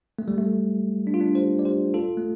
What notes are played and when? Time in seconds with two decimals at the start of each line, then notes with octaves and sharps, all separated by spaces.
0.19 A3
0.28 G3
0.38 A3
1.07 D4
1.14 F4
1.20 A3 D4
1.35 G4 C5
1.59 D5
1.65 G4 C5
1.94 F4 A4
2.17 A3